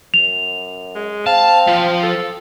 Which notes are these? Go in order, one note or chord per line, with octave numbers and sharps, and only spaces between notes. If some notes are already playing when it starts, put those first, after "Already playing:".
F#2 F7
G#3
C4 F5 A5
F3
A4